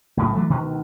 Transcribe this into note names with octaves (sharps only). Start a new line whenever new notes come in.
B1 A2 C#3
E3 F#3 A3
D2 B2 D#3